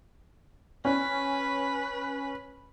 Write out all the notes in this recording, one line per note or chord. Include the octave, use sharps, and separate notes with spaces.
C#4 B4